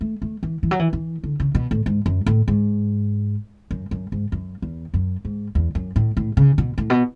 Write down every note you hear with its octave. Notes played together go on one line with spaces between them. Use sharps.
A3
A3
E3
E3
F#3
E3
E3
D3
C#3
B2
A2
G#2
F#2
A2
G#2
F#2
F#2
G#2
F#2
E2
F#2
G#2
E2
F#2
A2
A2
C#3
B2
A2
B2